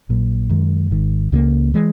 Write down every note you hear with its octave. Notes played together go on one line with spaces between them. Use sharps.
A#1 A#2 F#3
F#2 D#3 G#3
G#1 G#2 D#3
C#2 C#3 E3 A#3
E3 G#3